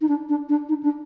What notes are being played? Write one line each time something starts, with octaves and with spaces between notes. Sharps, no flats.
D#4
D4
D4
D4
D#4
D4